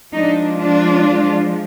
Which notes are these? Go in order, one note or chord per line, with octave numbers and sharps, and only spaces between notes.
F3 G#3 D4 D#4
D4 F4